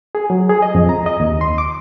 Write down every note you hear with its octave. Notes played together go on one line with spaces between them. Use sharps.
G#4
F#3
G#4
D#5
F2
A#5
D#5
D#2
C6
D6